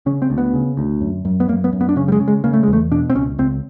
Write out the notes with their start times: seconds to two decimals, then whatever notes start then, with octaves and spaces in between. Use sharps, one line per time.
0.06 C#3 C#4
0.22 C4
0.30 D2
0.38 B3
0.54 C#3
0.77 D2
1.01 F#2
1.25 F#2
1.40 B3
1.48 F#2 A#3
1.64 B3
1.73 F#2
1.81 B3
1.89 D4
1.96 C#3 C#4
2.08 G3
2.12 G#3
2.20 C#3
2.28 G#3
2.44 C#3 A#3
2.53 A3
2.63 E2 G#3
2.73 A3
2.91 B2 D4
3.10 C4
3.15 C#2 C#4
3.38 C#2 C4